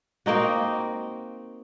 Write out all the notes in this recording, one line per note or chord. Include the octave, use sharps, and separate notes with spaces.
A#3 C4 D#4 F#4